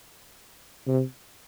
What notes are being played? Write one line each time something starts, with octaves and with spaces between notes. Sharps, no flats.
C3